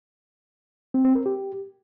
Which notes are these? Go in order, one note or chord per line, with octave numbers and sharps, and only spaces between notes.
C4
C4
A#4
G4